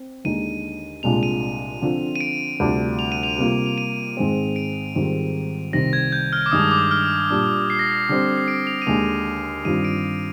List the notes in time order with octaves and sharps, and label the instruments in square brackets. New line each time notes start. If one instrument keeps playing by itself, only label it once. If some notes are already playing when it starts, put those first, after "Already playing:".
Already playing: [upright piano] C4
[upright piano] D#2 D3 G#3 D#4 [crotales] D#7
[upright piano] C2 A#2 G#3 D4 F4 [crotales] F7
[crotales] D#7
[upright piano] D3 F3 C4 F4
[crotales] D#7
D7
[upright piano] D2 C3 G3 D4 F4
[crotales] F7
D#7
F7
[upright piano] C3 G3 A#3 F4
[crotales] F7
D#7
[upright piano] G#2 D#3 G#3 C4
[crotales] D7
[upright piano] G#2 D#3 G3 C4 F4
[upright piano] C2 C3 D#3 G3 C4 [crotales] A#6
[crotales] G#6
G6
F6
D6
[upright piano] G2 D#3 G#3 D4 [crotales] D#6
[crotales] D6
F6
[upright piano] A#2 G3 D4
[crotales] C7
A#6
C7
[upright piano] D3 G3 C4
[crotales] C7
D7
F7
D#7
[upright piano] D#2 D3 G#3 [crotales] F7
[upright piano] G2 D#3 G3 C4 F4 [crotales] D#7
[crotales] D7